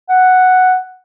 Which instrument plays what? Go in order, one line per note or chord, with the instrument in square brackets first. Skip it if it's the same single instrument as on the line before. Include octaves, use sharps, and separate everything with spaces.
[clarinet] F#5